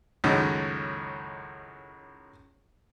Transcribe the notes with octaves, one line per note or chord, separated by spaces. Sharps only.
C#2 F#2 A2 D#3